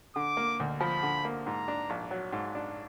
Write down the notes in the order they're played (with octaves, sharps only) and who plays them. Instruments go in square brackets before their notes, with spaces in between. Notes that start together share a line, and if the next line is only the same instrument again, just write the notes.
[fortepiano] D3 [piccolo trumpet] D6
[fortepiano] A#3
D2
[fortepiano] F3 [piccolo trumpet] B5
[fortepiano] D3
A#3
[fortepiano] G#2 [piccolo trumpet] A#5
[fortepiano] D4
A#1
F#3
G#2
D4